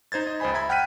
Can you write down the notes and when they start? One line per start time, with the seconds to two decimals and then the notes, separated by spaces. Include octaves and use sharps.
0.12 D#4 C5 G#6 A6
0.27 D#5
0.40 C#2 C5 D#5 G#5 B5
0.54 E5 A#5 B5 G#6
0.69 F#5 G5 F6 F#6 B6 D#7